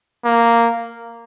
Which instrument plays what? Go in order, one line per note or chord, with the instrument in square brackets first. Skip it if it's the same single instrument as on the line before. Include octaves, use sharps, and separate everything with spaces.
[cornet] A#3